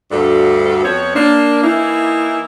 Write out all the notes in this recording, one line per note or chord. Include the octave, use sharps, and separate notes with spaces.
D2 G2 G3 F#4 A4
F2 B3 C5 C#5
A#3 D4
E3 A#3 D#4 E4